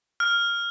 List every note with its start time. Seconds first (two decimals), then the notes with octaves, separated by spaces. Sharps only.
0.20 F6